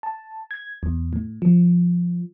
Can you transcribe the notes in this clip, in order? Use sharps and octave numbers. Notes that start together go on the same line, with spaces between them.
A5
G#6
E2
A2
F3